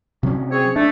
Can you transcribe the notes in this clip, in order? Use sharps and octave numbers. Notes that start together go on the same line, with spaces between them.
C3 F#3 C#4
C4 G#4 C#5
A3 D4